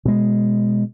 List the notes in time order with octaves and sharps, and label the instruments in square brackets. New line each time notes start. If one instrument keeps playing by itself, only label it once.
[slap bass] B2 G#3